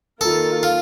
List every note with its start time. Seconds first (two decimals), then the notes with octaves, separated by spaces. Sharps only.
0.21 D#3 A#3 F4 A4 A#4
0.63 F4